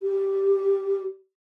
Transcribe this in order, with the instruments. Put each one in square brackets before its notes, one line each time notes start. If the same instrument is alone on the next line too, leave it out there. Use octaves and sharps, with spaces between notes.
[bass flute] G4